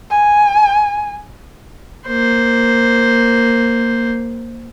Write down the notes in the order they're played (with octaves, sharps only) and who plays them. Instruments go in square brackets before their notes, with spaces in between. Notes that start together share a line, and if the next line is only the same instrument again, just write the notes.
[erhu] G#5
[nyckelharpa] A#3 C5